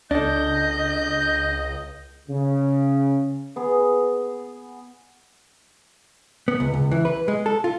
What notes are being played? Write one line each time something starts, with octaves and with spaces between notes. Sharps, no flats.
C#2 D4 A4 D#5 G6
C#3
B3 G#4
B3
C#2
C#2
E3
B4
G#3
A4
F4